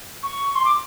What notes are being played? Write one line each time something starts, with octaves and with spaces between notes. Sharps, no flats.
C#6
C6
D6